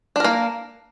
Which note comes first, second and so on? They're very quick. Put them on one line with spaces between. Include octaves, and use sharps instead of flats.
D4 A#4 A#3